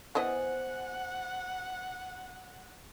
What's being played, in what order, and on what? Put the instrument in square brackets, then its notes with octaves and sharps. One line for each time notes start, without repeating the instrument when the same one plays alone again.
[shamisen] B3 E4 D#5 [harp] C5 D5 G#5 [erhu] F#5